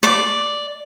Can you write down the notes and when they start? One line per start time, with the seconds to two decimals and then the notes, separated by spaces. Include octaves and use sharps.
0.03 D5 D6